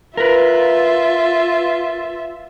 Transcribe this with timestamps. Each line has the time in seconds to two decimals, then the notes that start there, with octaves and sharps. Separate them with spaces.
0.17 F4 A#4 B4 E5